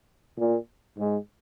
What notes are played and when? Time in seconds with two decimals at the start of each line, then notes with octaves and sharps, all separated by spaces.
0.37 A#2
0.97 G#2